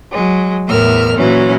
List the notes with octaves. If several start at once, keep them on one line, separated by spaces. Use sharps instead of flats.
F#3 G#3
E2 A2 A#4 E5 F6
A#2 E3 F#3 C#4